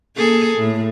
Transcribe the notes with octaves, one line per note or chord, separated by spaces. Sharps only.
A#3 G#4 A4
A2